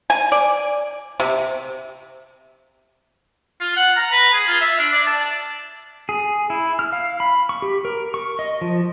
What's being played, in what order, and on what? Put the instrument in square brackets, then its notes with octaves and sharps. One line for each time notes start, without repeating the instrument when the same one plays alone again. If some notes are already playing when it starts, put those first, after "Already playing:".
[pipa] G#5
D5
C3
[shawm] F4
F#5
A#5
B4
G#4
F4
E5
D4
D5
A5
[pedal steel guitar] G#4
E4
F6
F5
B5
C#6
G4
A#4
C#6
D#5
F3